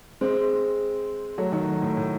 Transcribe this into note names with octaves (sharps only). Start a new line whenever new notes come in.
G#3 C4
F#3 A3
D#3 F#3
A2
A2